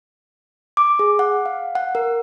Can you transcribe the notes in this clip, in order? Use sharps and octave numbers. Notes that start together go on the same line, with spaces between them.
D6
G#4
F#5
F5
F#5
A#4